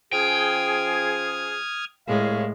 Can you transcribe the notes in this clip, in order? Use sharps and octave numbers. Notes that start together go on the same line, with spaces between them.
F3 C#4 G#4 G5 D#6 F6 G#6
C2 A2 G#3 C#5 F5